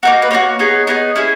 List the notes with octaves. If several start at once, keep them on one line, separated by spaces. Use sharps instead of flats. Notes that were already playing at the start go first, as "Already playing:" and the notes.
A#3 D#4 F#4 A#4
B4
A#3 D#4 F#4 C#5
B3 D#4 G#4
B3 D#4 G#4
C#4 E4 G#4